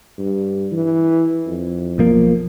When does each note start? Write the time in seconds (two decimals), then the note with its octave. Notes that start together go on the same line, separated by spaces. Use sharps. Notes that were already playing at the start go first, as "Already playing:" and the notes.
0.18 G2
0.72 E3
1.47 F2
1.98 B1 F3 A#3